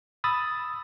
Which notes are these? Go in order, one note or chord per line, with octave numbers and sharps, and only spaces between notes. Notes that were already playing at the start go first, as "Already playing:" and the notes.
B5 D#6 E6 A6